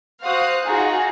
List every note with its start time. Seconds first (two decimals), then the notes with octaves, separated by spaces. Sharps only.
0.23 F#4 C5 F5 D#6 F#6
0.66 D#4 F4 F#4 G#4